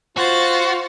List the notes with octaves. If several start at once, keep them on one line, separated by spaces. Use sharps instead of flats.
F4 F#4 C5 A6